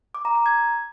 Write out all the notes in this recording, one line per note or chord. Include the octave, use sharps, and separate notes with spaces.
D6
A#5
A#5
G#6